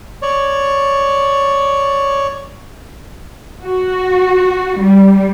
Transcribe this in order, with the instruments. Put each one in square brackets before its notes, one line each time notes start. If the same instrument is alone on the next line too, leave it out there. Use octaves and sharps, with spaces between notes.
[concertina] C#5 D5
[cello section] F#4
G3